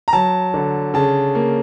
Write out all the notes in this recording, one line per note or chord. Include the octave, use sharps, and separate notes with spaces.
A#5
F#3 A5
D3
C#3 A5
A#3